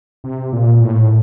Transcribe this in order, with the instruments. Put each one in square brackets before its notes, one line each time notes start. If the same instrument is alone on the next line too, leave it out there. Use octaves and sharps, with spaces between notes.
[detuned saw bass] C3
A#2
A2